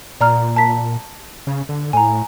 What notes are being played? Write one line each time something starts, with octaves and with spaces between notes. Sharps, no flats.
A#2 D5 A#5 F6
A5 A#5 B6
C#3
D3
A2 G#5 A#5